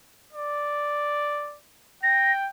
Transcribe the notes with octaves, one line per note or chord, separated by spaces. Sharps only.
D5
G5 A#6